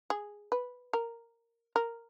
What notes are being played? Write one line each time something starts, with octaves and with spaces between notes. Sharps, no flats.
G#4
B4
A#4
A#4